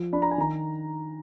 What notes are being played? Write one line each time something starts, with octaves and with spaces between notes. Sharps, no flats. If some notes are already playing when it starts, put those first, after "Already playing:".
Already playing: F3
D4 B5
A#5
G#5
D#3 A#5